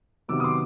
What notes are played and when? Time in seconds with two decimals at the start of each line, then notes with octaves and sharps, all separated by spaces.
0.28 C3 D#3 F#3 B3 D6 E6
0.40 D#6
0.44 C6 D6